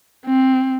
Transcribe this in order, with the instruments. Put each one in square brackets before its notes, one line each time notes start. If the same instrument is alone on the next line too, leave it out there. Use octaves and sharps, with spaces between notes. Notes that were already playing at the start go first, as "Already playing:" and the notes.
[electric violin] C4